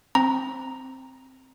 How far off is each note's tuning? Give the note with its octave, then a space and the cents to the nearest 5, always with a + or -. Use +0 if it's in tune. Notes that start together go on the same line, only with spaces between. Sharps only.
C4 +0 A#5 +0